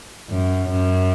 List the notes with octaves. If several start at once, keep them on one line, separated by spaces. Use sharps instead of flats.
F#2
F#2